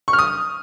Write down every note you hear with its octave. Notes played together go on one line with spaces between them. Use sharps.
C#6
F6
D#6